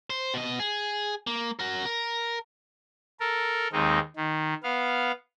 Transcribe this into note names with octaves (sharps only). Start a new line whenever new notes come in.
C5
B2 D#5
G#4
A#3
F#4 A#4
A#4
A4 A#4
D#2 G#3 C4 D#4
D#3
B3 F5